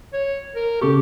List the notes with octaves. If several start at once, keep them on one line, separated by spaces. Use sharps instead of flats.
C#5
A#4
C#3 G4 A4 C#6